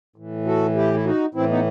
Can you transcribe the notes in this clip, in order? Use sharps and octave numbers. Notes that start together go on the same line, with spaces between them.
A2 E3
F#4 A4
E4 G4
E4
D#4 F#4
A2 E3 C4 E4
B3 D#4